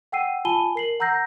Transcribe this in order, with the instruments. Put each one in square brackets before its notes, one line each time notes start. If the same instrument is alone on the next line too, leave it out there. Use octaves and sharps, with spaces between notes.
[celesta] F#5 G5 E6 C7 D#7
F4 G#5 A5 B5 D#7 G7
A#4 C7 F#7
F#5 A#5 E6 G6 A#6 C7